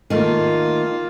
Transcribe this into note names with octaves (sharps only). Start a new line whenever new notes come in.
D#3 A3 A#3 F4